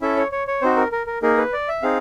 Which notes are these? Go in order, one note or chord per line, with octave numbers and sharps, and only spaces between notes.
C#4 E4 A4 E5
C#5
C#5
C#5
C4 D#4 F#4 C5
A#4
A#4
A#4
A#3 D#4 G#4 A#4
B4
D5
E5
C4 D#4 G#4 F5